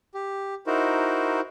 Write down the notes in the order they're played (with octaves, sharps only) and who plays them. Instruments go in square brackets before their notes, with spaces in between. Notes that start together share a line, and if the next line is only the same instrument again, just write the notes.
[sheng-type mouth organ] G4
D#4 E4 F#4 A#4 C5